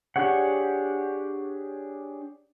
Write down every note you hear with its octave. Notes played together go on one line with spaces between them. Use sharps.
D4 G4 G#4 C#5 F#5